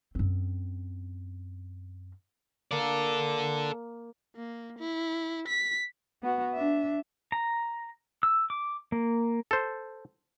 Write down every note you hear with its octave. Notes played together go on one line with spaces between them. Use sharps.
F#2 C4
A#3 A4 D5
A#3
E4
B6
B3 F#4
D4 E5
A#5
E6
D6
A#3
A4 C5